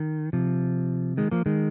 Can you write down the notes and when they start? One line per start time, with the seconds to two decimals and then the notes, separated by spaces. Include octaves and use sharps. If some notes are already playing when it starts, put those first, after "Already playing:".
Already playing: D#3
0.33 C3 F3
1.17 D#3 G#3
1.31 F3 A#3
1.46 D#3 G#3